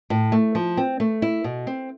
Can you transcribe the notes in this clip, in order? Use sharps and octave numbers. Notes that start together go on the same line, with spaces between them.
A2
A3
F3
C4
A3
E4
B2
C4